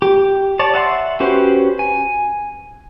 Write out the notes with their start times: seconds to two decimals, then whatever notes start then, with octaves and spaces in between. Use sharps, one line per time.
0.02 G4
0.59 C#5 D5 A5
0.74 E5 F#5 A5 C6
1.20 C#4 F#4 G4 B4 C5
1.79 G#5